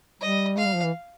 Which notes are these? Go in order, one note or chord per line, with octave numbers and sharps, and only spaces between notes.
G3 D#5
G#3 F5
G3
F3
E3